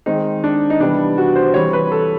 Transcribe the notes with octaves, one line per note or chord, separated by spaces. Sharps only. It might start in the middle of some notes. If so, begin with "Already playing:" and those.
D#3 G#3 C4 D#4
D4
D#4
C3 E3 G3 B3 D4
F#4
C5
E3 G3 C4 C#5
B4
A4